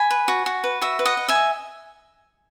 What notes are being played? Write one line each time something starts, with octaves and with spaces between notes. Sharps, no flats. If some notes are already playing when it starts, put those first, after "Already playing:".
Already playing: G#5 B5
B4
F#4
F#4
B4
F#4 E5
B4
D#5 F#5
D#5
E5 G#5
D#5